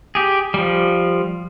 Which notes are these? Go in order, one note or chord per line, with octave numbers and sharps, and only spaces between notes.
G4 G#4
F3 G3